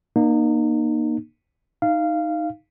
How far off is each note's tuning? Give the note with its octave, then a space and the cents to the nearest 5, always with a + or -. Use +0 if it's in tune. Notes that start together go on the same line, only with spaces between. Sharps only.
A#3 +20 D#4 -30
D#4 +0 F5 -15